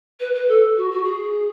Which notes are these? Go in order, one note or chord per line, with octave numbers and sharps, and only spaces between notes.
B4
B4
A4
F#4
F#4
G#4